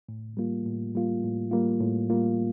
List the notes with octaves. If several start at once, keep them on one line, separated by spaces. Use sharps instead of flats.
A2
G3 A#3 F4
A2
G3 A#3 F4
A2
G3 A#3 F4
A2
G3 A#3 F4